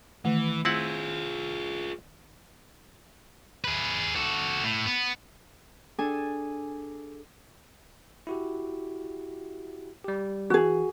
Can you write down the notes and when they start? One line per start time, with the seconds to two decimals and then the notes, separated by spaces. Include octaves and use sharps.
0.25 D#3 E3 A3
0.65 C4 E4 F4 G#4 F#5
3.64 G#4 B4
4.16 F#4 A4
4.64 A2
4.86 B3
5.99 D4 G#4 A4 G#5
8.27 E4 F#4 G4
10.04 G3 G4
10.50 E3 F#4 G#4